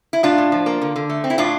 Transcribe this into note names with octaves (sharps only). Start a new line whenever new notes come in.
E4
A2 D4 F4
A2
F3
A#3
D3
D3
A3
C4
E4
A2 D4 F4